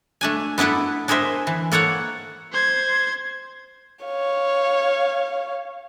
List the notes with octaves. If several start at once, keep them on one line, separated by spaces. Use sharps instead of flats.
A3 D4 G#5
B3 D4 E4 A4 B4
D4 G#4 A#4 C5 E5
E3
A#3 A4 C#5 F#5
C5 G#6
C#5 F5